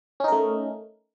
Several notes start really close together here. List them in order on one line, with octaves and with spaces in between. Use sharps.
C#4 D#4 A#4 A3